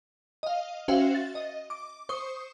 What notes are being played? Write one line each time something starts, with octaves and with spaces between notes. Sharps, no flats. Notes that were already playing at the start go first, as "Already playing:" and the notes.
D#5 F5
C#4 F#4 C5 E5 F5 G5
A6
D#5
D6
C5 C#6 D#6